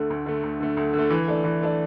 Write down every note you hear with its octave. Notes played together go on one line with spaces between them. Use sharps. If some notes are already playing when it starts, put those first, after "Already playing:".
Already playing: D2 D3 A3
D2
D3 A3
D2
D3 A3
D2
D3 A3
E3
A3 D4
E3
A3 D4